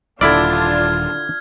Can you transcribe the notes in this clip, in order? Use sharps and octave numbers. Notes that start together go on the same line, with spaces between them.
D#1 D3 D4 E4 F4 D5 F6 G#6